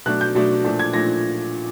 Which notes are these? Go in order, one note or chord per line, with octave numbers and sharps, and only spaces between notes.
B2 F#3 A3 D4 F#6
G6
B2 F#3 A3 D4
A#2 F3 A3 D4
G#6
A#2 F3 A3 D4 A#6